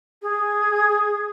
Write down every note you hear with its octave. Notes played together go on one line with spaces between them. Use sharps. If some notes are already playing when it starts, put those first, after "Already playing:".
G#4